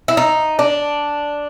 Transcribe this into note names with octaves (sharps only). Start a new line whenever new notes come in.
E4
D#4
D4